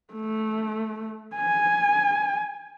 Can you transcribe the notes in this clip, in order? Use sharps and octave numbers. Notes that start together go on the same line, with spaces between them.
A3
G#5